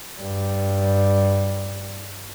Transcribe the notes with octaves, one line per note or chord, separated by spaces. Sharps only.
G2 G3